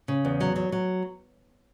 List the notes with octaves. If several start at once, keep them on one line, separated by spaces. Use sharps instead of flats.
C#3
E2
F#3
F#3
F#3